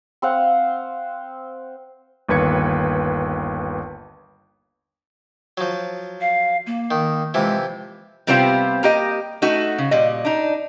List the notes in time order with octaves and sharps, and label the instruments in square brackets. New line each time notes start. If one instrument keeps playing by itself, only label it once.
[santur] C4 C5 F5 F#5
[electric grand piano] G1 D#2 B4 G#6 C#7
[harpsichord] F3 F#3
[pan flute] F5
A#3
[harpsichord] D#3
[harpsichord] C3 E3 F3 [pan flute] G#3
[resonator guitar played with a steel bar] C3 G3 B3 C4 F4 C5
A#3 G4 D#5
A3 D#4 F#4
C#3
A#2 G3 D#5
D4 D#4